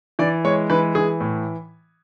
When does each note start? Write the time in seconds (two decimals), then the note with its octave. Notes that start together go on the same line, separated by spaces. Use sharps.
0.19 E3 D5
0.45 G#3 C#5
0.70 E3 B4
0.95 E3 G#4
1.20 A2